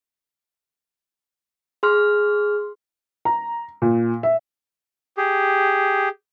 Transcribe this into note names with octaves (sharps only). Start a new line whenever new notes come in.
G#4 C6 F6
A#5
A#2
E5
G4 G#4